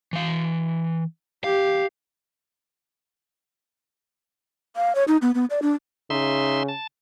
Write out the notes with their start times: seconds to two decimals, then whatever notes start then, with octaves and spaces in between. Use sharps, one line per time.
0.13 E3 F5
1.44 G4 F5
4.76 F5
4.95 C#5
5.08 D#4
5.22 B3
5.35 B3
5.50 D5
5.62 D4
6.10 C#3 D#4 E5 C6
6.68 A5